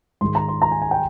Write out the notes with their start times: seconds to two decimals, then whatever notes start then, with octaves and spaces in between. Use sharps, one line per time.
0.21 G#2 D#3 G#3 C6
0.35 A#5
0.48 C6
0.62 A#5
0.71 G#5
0.82 G#5
0.91 G5